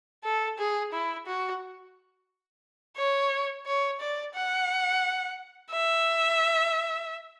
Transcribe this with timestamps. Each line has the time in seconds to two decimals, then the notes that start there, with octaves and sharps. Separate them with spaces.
0.24 A4
0.58 G#4
0.93 E4
1.27 F#4
2.97 C#5
3.67 C#5
4.00 D5
4.34 F#5
5.71 E5